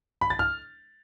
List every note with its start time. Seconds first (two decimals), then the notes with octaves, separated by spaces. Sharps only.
0.21 B5
0.30 A6
0.39 F6